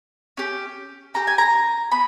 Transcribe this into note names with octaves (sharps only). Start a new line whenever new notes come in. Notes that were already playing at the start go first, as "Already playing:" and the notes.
C#4 G4
C#4 G4 A#5
G#5
A#5
B3 B5